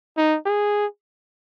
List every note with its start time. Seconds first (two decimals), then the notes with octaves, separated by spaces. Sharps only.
0.17 D#4
0.46 G#4